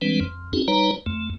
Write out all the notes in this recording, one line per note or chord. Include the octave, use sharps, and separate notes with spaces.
E3 G3 G#3 C4 D4 B4
F2
C4 C#4 D#4 F#4 G#4
G3 D#4 B4 C#5 A#5
F2 A3